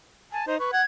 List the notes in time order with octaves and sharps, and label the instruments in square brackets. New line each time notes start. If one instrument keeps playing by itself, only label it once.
[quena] G#5 [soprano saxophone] A5
[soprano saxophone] D#4 [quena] C5
[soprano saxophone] B4 [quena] C#6
[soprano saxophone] F#5 [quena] G#6